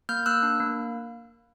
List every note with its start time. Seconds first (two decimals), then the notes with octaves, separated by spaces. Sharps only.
0.09 A#3 F6 G6
0.26 A#3 E6 F#6
0.43 D4
0.60 A#3